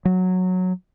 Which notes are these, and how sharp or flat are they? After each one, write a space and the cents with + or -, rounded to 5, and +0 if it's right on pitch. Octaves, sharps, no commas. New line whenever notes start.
F#3 -10